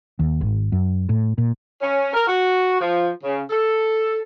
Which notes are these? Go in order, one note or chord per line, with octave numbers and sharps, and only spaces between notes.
D#2
G#1
F#2
A2
A#2
C#4
A#4
F#4
F3
C#3
A4